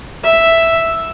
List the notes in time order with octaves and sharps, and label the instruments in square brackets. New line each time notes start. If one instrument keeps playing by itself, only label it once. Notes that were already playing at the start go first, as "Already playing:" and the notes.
[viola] E5